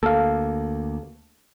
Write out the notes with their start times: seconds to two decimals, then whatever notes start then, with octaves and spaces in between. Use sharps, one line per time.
0.03 D2 A#3 A4 F5